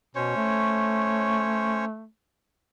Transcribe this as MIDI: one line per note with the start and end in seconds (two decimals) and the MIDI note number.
0.15 0.31 47
0.15 1.85 61
0.15 1.85 72
0.15 1.85 73
0.36 2.06 57